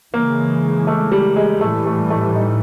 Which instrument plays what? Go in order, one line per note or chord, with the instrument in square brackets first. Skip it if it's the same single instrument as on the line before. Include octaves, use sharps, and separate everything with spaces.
[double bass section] C#3 E3 G#3 [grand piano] A#3
[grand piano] A3
G3
G#3
[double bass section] A2 E3 G3 [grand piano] A3
[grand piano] A3
A3
D#4